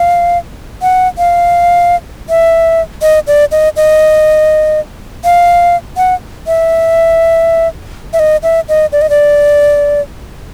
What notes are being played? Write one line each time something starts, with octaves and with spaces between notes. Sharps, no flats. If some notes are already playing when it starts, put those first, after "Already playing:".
Already playing: F5
F#5
F5
E5
D#5
D5
D#5
D#5
F5
F#5
E5
E5
D#5
E5
D#5
D5
D#5
D5